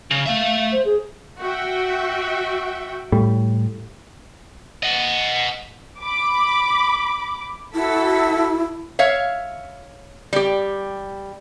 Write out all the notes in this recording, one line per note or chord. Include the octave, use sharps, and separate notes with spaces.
C#3
A3 E5 F5
C5
G#4
F#4 E5 G5
A2 G3
D#5 F#5
B5 D6
E4 F#4 A4 B6
C#5 E5 F5
G3 G4